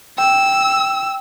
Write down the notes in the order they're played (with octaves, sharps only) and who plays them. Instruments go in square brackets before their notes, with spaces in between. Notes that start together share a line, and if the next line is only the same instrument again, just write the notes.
[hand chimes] G5 [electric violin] E6